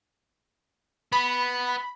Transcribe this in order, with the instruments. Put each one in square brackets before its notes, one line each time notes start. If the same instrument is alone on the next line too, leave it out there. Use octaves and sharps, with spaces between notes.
[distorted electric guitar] B3 [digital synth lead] B5